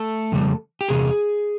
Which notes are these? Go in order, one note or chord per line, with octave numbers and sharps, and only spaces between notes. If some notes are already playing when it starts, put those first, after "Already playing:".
Already playing: A3 A4
F2 C#3 G3
G4
E2 C3 G#4